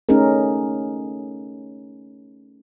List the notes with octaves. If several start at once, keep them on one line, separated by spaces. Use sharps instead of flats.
A3 C#4 D#4 G#4 A#4